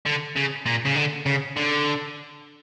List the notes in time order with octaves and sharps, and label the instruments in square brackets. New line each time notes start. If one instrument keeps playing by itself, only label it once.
[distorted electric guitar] D3
C#3
A#2
C#3
D3
C#3
D3